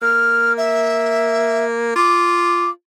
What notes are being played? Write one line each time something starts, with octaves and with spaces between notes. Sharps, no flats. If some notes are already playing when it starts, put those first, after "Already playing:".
A#3 F6
E5
F4 D6